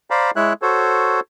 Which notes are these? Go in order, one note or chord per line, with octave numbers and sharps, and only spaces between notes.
C5 D5 F5 A#5 B5
G#3 E4 C#5 E5 F#6
F#4 A4 C5 C#5